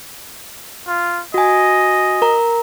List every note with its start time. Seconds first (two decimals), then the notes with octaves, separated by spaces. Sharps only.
0.87 F4
1.34 F#4 D#5 G#5
2.22 A#4 A#5